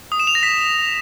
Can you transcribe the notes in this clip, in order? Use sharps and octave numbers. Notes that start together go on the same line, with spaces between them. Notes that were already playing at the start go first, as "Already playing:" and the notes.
D#6
E7
F7
A#6
B6